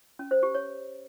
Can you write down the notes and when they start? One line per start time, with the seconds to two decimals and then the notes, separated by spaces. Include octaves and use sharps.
0.19 C#4
0.31 C5
0.43 G4
0.54 C#5